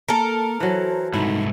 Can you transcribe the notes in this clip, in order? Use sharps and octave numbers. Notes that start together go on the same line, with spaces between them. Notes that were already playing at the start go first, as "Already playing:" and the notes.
A#3 A4 A#4
E3 F#3 C5
C2 G#2 D#4 E4